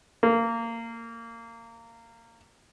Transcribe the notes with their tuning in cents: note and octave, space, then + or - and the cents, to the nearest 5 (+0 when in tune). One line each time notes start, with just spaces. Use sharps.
A#3 -20